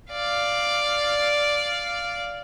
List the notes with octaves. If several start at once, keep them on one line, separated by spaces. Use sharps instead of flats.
D5 F5